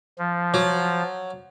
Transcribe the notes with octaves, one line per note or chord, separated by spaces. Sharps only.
F3
F#3